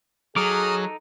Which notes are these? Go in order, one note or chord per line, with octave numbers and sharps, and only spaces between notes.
F#3 D#4 G#4 A4 D6 D#6 F6